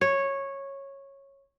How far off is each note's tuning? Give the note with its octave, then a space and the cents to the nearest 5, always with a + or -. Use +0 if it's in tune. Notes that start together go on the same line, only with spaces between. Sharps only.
C#5 -10